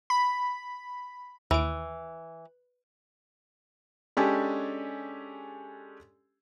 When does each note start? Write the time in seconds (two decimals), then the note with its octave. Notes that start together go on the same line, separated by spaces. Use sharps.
0.10 B5
1.51 D#2 E3 D7
4.17 G#3 C#4 D4 G4 A4 G#5